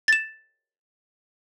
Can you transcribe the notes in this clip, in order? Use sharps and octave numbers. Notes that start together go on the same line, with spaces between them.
A6 E7